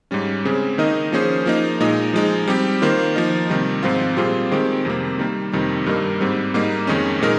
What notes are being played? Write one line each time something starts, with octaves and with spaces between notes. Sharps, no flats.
G#2 G3 C#4
C#3 G#3 C4
D#3 A#3 D#4 A#4 D#5
F3 A#3 C#4 G#4 C5
F3 A#3 D#4
A#2 G#3 D#4
F3 G#3 D#4
G3 C4 G4
D#3 A#3 F4 C5
F3 A#3 D#4
C3 D#3 G3
G#2 F3 C4 F4
A#2 G3 C4 F4 G#4
D#3 G#3 C4 G4
F2 C3 G3 A#3
D#3 G3 A#3
F2 C3 D#3 G3
G2 G3 A#3 D#4 A#4
G#2 G3 C4
G#2 G3 A#3 D#4
F2 D#3 G#3 C#4
A#2 G#3 D#4 A#4